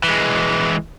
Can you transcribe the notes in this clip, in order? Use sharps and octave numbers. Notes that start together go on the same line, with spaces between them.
E3 G#3